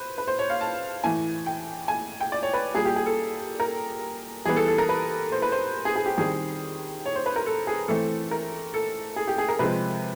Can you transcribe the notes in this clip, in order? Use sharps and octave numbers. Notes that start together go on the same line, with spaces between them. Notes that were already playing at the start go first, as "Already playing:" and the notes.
Already playing: B4 C5
B4
C5
C#5
F5
A5
A2 E3 A3 G#5
G5
G#5
G5
D5
C#5
B4
A#2 G3 A#3 G#4
G4
G#4
A4
A#4
E3 G3 B3 G#4
A4
A4
A#4
B4
C5
B4
C5
G#4
G#4
G4
D#3 G3 C4 G#4
C#5
C5
B4
A#4
A4
G#4
E3 A3 C4 A4
A#4
A4
G#4
G4
G#4
A#4
C3 F3 G#3 C4 B4